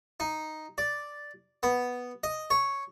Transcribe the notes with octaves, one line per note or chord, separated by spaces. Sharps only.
D#4
D5
B3
D#5
C#5